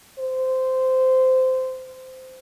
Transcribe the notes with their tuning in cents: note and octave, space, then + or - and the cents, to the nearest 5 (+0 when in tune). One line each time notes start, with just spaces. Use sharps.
C5 -15